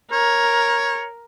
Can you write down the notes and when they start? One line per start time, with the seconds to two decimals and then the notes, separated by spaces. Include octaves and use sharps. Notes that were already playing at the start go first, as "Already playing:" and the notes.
0.12 A#4 C#5